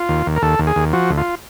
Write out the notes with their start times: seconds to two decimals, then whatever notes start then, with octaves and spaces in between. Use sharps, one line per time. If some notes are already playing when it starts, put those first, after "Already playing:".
Already playing: F4
0.09 D#2
0.26 D#2
0.36 A#4
0.42 D#2 A4
0.59 D#2
0.67 G#4
0.76 D#2
0.93 F3 F#4
1.10 D2
1.17 F4